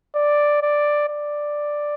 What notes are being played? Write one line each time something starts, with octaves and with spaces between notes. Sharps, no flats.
D5
D5
D5